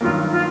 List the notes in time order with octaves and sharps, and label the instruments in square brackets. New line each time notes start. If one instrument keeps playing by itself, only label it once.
[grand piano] G2 D#3 F#3 A#3 [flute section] F4
[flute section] F4